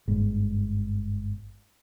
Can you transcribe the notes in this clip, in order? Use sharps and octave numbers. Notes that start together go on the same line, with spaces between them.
G1 G#2